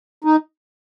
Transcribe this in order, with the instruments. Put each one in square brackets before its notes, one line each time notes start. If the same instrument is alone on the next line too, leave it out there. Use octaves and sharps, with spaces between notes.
[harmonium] D#4